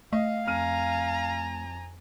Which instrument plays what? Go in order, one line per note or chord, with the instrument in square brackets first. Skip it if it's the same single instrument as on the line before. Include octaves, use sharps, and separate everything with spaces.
[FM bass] A3 [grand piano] D#5 [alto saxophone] F5
[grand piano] F2 F6 D#7 [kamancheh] G#5 A#5